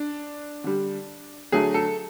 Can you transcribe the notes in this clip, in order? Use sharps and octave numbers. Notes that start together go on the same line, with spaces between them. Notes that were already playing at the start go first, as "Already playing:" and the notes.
Already playing: D4
D3 G3
D3 F#3 A3 G#4
A4